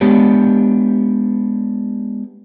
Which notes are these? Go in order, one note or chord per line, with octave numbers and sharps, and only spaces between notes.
G#3 B3 D4 G4 C#5